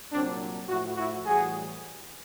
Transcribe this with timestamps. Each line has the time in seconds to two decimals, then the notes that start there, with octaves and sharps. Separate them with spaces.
0.12 C2 A#2 F#3 C4 D4
0.68 A2 F3 E4 F#4
0.97 E4 F#4
1.25 A2 E3 G3 F#4 G#4